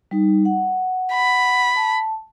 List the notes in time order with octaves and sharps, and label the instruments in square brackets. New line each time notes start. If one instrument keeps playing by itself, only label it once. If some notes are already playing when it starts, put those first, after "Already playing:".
[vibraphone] G3 D#4
F#5
[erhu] B5
[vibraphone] A5